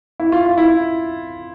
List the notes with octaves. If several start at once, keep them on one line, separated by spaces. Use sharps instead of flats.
E4
F4
F4
E4